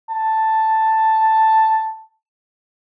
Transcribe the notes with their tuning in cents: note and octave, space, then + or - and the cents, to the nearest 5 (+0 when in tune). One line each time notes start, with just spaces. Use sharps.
A5 +5